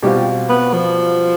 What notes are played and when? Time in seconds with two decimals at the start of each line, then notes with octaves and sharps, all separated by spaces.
0.03 B2 G3 C4 F4 G4
0.49 B3
0.73 F3